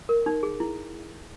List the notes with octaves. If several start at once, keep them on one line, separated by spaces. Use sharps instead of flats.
A#4
D#4
G#4
E4